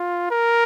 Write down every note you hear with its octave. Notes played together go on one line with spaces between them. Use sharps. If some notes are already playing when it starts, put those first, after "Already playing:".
Already playing: F4
A#4